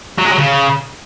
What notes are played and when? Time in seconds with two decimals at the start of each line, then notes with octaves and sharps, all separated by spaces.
0.18 F#3
0.25 G#3
0.31 F#3
0.38 C#3